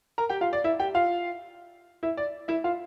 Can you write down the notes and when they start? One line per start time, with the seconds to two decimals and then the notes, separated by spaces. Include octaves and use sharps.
0.18 A#4 A#5
0.29 G4 G5
0.41 F4 F5
0.53 D5
0.64 E4 E5
0.80 G4 G5
0.94 F4 F5
2.03 E4 E5
2.17 D5
2.48 E4 E5
2.64 F4 F5